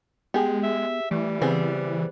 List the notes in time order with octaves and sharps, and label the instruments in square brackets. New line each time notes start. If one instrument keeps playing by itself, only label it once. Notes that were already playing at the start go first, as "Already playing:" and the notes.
[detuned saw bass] G#3 [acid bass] B3 [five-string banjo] G4 G#4
[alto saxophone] E5
[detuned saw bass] E3 [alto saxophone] G3 [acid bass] A3
[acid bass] C#3 [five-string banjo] B3 C4 G#4